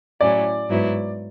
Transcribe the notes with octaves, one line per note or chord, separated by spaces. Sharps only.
A2 F#3 C#4 E4 D5
G#2 F#3 B3 E4